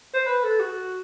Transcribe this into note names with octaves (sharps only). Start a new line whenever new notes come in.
C5
B4
A4
F#4